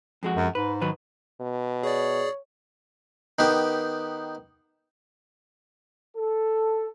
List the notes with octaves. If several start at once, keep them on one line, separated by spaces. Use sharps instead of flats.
F2 G#3 F#4
F#2
G#2 B4
D#3 F#3 B4
B2
G#4 C#5 D5
D#3 B3 G4
A4